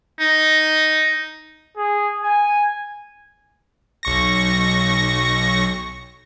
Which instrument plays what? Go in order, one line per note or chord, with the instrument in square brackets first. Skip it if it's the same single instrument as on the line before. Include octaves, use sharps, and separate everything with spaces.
[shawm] D#4
[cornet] G#4
G#5
[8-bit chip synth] B1 C#6 A#6